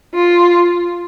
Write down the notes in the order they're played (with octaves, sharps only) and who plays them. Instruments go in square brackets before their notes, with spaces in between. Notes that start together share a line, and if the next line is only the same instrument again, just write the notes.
[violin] F4